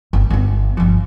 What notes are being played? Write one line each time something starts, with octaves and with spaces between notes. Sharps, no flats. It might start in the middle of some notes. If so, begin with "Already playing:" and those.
G1
G1 B3
G1 F3